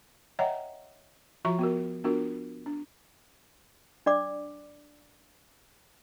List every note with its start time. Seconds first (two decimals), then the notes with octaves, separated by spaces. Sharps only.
0.39 C#5 D#5 E5 F#5 G5 A#5
1.45 F3 F4 F#4 E5 A#5 C#6
1.59 B3 F#4 A#4
2.04 B3 D4 F4 F#4 A#4
2.66 D4
4.06 D4 D5 D6